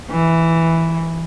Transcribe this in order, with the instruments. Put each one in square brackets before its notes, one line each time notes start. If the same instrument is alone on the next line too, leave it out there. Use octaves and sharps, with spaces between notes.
[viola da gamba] E3